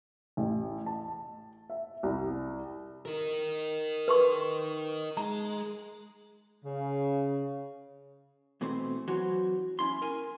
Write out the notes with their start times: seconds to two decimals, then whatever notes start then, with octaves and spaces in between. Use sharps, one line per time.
0.37 A1
0.86 A5
1.70 E5
2.03 C2
3.05 D#4 A#4
4.08 B4 C6 C#6
5.17 G#3 A#5
6.65 C#3
8.61 B2 E3 A3 C4
9.08 E3 F#3 F#4 C5
9.79 C#4 E4 C6
10.02 A#4 G#5